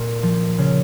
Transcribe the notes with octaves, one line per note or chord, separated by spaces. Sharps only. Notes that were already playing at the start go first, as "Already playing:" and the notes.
Already playing: A#2 A#3
F3
C#3